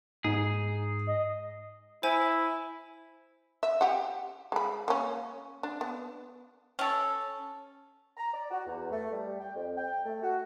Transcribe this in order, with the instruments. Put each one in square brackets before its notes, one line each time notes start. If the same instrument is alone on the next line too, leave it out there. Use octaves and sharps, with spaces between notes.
[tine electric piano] G#2 [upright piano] D#4 [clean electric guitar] G#4
[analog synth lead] D#5
[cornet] E4 [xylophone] C5 G#5
[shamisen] E5
G4 F#5
G#3 B5
A#3 C#4
D4
B3
[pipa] C#4 A4
[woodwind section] A#5
D5
F#4
E2
A3
G3
G5
F2
G5
A3
F#4